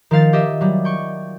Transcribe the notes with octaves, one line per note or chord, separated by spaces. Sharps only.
D#3 F3 F5 A6
G4 D#5 E5
F#3 G3
G5 C#6